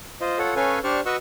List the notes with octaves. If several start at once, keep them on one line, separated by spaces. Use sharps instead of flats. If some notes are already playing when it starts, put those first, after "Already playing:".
F4 C5 D#5
F4 A4 C#5 F#5
C#4 A4 B4 C#5 F5 G#5
D4 G4 C5 D5 C#6 F6
F#4 B4 D#5 F#5 C#6 E6